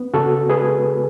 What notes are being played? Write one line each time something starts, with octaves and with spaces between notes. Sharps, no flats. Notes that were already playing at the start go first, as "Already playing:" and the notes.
Already playing: B3
C#3 F#4 A4
G#3 G#4 B4